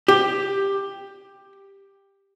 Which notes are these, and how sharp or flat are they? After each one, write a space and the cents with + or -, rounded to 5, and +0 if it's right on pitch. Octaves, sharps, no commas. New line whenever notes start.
G4 +10